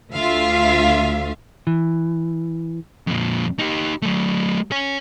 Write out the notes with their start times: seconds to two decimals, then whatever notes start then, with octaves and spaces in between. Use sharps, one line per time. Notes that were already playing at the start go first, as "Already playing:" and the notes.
0.13 D2 F4 E5 F5
1.67 E3
3.07 F2 A#2
3.59 D#4 G4
4.02 F#3 A3
4.72 C#5 G#5